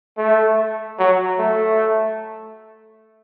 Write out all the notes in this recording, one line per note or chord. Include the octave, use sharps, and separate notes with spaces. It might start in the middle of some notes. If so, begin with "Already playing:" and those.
A3
F#3
A3